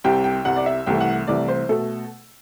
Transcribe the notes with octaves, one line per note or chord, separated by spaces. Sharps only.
C2 C3 G3 G5
G5
C2 C3 G3 F#5
D5
E5
C2 C3 E3 A3 G5
F#5
C2 C3 E3 A3 D5
C5
B2 A3 A4